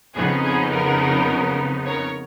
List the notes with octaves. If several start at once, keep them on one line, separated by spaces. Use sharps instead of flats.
F2 C#3 F3 B3 D#4 G#4
G#4
A#4
A#4 C#5